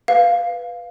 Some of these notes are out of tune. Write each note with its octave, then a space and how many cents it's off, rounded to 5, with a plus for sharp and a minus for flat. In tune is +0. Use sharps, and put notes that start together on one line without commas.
B4 +0 F5 +0